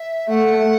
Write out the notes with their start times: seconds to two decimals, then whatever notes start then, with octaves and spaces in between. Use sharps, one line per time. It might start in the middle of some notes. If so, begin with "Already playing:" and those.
Already playing: E5
0.28 A3 F#5